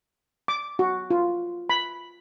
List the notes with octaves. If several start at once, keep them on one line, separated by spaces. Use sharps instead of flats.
D6
F#4
F4
B5